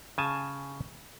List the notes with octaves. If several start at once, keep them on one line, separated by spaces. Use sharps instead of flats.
C#3 G#5 A5